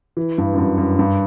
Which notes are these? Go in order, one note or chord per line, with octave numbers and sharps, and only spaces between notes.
E3
G2
F#2
G2
F#2
G2